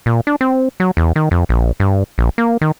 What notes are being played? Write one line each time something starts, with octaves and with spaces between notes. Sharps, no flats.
A#2
D4
C4
F#3
E2
D#3
F2
A#1
G2
A#1
A#3
D#3